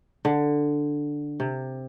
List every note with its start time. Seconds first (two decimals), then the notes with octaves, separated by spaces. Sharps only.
0.25 D3
1.40 C3